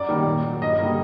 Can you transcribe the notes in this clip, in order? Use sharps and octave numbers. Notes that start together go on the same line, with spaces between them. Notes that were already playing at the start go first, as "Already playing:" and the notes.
Already playing: F#2 D5
D#3 G3 A#3
A#2
F#3 A#3
G2 D#5
D3 G3 A#3